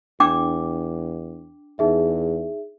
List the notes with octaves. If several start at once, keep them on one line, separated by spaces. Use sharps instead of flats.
E2 D4 G5 D6
E2 D#4 G#4 E5